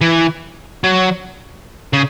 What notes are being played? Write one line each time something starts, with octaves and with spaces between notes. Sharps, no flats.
E3
F#3
C#3